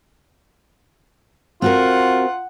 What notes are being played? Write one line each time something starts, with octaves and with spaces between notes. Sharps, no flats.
C4 F4 F#4 A#4 F#5